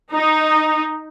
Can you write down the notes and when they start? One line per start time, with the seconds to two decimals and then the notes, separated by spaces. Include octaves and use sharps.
0.13 D#4